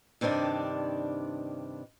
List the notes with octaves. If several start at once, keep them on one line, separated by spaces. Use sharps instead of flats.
G2 C3 D#3 D4 D5